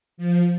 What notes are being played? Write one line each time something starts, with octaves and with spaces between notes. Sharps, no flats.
F3